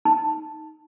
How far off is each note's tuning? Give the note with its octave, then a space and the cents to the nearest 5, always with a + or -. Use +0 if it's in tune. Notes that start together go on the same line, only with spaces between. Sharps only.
D#4 +0 A5 +0